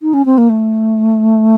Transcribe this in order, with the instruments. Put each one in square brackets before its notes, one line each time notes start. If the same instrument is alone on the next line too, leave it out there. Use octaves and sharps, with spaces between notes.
[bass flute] D#4
C#4
C4
A#3
A3